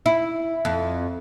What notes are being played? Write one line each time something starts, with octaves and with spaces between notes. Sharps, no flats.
E4
F2